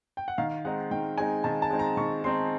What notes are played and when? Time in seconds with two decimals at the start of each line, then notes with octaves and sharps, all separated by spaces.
0.17 G5
0.28 F#5
0.38 D#3 F5
0.65 G#3 C4 D#4 F#5
0.91 D#3 G5
1.18 G#3 C4 D#4 G#5
1.44 D#3 A5
1.62 A5
1.70 G#3 C4 D#4
1.79 A#5
1.97 D#3 C#6
2.24 G#3 C4 D#4 C6